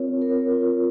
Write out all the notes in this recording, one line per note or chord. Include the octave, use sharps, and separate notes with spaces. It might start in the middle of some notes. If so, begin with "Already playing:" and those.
Already playing: C4 F4 A#4 C#5
A#4
F4